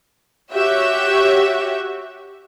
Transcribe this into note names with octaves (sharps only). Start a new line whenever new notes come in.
F#4 G4 C#5 E5